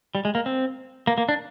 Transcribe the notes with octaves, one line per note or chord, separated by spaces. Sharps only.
G3
G#3
A#3
C4
A#3
A#3
D4